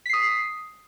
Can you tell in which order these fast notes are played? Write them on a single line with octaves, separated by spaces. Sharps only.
B6 C7 D#6